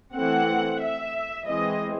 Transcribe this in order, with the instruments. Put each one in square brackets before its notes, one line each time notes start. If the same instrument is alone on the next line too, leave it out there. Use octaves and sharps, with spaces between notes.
[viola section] E3 A3 C4 F#5
E5
E3 G#3 C4 D#5